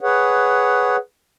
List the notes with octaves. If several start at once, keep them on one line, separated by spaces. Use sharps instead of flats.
G#4 B4 C#5 F#5